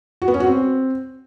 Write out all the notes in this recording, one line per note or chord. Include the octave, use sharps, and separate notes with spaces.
F#4
B3
C#4
F#4
C4